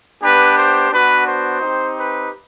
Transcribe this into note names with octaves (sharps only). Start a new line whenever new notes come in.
B3 D4 G4 B4
C5
B3 D4 F#4 B4
C5
C4 D#4 G4
B4